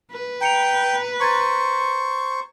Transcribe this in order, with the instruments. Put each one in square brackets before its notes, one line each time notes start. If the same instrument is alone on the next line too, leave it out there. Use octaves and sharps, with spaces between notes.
[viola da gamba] B4
[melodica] G5 [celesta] A#5 C#7 F7
[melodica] C5 C#6 [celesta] A#5 G#6 A6